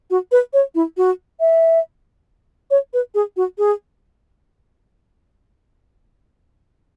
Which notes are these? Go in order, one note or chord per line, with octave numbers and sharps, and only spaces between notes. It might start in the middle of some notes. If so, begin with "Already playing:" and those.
F#4
B4
C#5
E4
F#4
E5
C#5
B4
G#4
F#4
G#4